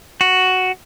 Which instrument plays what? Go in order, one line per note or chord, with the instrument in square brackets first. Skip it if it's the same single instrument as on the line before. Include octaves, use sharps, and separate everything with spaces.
[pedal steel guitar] F#4